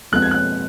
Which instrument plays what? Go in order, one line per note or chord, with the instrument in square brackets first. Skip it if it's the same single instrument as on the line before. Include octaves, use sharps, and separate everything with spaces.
[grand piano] F2 F3 G#3 B3 F#6
G#6
F#6